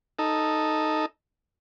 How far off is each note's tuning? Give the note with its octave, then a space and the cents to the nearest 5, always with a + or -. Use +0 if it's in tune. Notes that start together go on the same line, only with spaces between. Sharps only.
D#4 +0 A4 +0